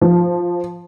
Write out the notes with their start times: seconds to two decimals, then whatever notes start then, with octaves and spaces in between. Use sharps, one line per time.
0.01 F3